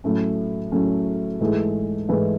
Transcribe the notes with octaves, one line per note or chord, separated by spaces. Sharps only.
A2 F#3 A3 C#4
A2 F#3 A3 C#4
G#2 E3 A3 E4 G#4
G#2 E3 A3 E4 G#4